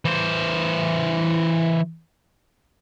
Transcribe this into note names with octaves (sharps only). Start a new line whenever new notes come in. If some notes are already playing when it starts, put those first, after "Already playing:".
E3 C5